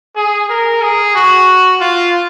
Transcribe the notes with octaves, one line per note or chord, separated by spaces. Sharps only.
G#4
A#4
G#4
F#4
F4